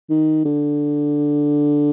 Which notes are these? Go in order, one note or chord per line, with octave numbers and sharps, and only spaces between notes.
D#3
D3